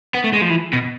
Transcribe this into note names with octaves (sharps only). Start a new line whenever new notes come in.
B3
A3
G#3
F3
E3
B2